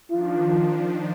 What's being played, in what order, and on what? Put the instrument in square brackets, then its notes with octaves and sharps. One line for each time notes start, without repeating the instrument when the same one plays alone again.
[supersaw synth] D#3 F3 D4 [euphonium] F4